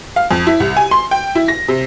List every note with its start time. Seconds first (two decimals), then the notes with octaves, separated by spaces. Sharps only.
0.16 F5
0.31 F2
0.47 E4
0.60 C2
0.77 G#5
0.91 C6
1.11 G5
1.35 E4
1.48 A#6
1.68 C3